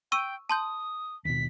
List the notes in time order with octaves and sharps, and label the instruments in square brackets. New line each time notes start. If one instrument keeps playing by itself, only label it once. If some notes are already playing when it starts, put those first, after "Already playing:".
[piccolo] G5 [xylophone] C#6 E6 D#7
[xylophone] A5 C6 G6 [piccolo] D#6
[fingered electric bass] D#2 B2 [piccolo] B6